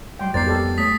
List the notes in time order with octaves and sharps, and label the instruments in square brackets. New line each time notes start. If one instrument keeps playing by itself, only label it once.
[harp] G#2 F#3 G3 [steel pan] G5 C6
[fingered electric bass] F2 B3 [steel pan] A#4 C5 D5 [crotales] A6 C7
[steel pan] G4 A4 D5
[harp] A3 G#4 C#5 [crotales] D#6 B6